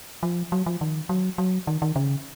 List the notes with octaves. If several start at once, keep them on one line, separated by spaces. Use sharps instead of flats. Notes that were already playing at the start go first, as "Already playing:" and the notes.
F3
F#3
F3
D#3
F#3
F#3
D#3
D#3
C#3